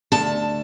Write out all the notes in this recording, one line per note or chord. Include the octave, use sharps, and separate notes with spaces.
D2 A5